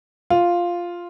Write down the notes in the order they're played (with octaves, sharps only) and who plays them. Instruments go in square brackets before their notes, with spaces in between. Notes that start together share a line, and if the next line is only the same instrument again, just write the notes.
[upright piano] F4